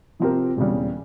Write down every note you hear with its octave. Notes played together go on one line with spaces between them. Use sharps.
C3 F3 C4 G4 A#4
E1 E2 C#3 G3